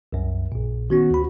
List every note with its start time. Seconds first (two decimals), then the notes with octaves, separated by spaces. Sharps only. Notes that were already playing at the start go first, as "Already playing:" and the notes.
0.13 C2 F#2
0.52 A#1 A#2
0.90 D#3 B3 C#4 F#4
1.10 D2 B5